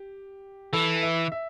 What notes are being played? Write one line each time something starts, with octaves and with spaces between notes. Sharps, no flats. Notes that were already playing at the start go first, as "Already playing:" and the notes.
Already playing: G4
E3 A4
E5
E5